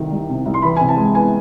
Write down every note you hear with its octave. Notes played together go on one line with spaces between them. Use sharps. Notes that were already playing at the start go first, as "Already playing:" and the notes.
Already playing: C2 C3 D#3
G3
C3
C2
C6
E3 B5
C3 G#5
A5
G#3
B3 G#5